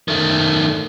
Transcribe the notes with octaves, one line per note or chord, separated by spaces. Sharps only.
D#3 A3